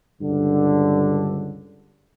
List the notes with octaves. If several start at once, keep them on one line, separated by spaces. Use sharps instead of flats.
C#2 G2 D3